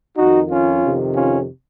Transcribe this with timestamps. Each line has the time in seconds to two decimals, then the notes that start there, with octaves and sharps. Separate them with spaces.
0.16 F2 D#3 D#4 F#4
0.50 C#4 F4
0.82 F2 C3 D#3
1.14 C#4 F4